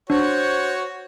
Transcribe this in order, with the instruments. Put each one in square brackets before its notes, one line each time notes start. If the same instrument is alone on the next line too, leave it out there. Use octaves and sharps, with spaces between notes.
[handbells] D4 [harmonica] F#4 C#5 [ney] C5